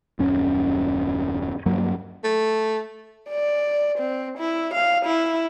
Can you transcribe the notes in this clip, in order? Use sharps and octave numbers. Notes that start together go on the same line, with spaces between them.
D#1 F#2 C#4
G2 F#3 A#3
A3
D5
C4
E4
F5
E4